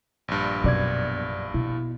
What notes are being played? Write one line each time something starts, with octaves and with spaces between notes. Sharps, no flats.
A#1 G2
F#2 B2 D5 G#6
B2 E4